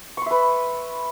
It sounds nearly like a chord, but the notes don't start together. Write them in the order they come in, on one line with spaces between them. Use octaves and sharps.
C#6 C6 E5 B4